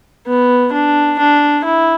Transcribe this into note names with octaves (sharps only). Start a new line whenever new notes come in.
B3
D4
D4
E4